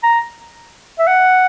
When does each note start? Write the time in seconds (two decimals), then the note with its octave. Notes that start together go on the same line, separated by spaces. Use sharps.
0.03 A#5
0.99 E5
1.08 F#5